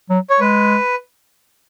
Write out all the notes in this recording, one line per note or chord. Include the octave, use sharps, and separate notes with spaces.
F#3
C#5
G#3 B4